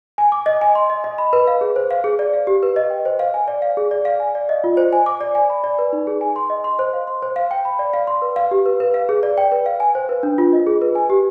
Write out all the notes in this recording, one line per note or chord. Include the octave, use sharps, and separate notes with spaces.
G#5
D6
D#5
G#5
C6
D#5
D#5
B5
B4
F5
G#4
C5
F5
G#4
D5
F5
G4
B4
D#5
G5
C5
F5
G#5
D5
F5
G#4
D5
F5
G#5
D5
D#5
F4
C5
G#5
D6
D5
G#5
B5
D5
B4
D#4
G#4
G#5
C6
D#5
C6
C5
F5
C6
C5
F5
G5
B5
D5
F5
C6
B4
F5
G4
B4
B4
F5
G#4
D5
G5
B4
F5
G#5
C5
B4
D4
F4
D#5
G#4
B4
G#5
G4